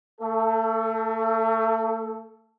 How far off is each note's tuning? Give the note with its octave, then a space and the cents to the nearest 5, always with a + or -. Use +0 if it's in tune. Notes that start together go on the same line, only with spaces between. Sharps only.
A3 +35 A4 +0